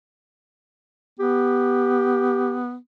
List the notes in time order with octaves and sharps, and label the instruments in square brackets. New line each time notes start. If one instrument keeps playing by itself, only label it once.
[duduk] B3 [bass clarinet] G4